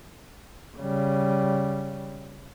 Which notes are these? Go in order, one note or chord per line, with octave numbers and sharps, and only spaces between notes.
C#3 G3